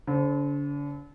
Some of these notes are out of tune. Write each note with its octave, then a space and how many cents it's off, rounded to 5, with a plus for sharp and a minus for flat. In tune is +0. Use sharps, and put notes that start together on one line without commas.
D3 -40 C5 +0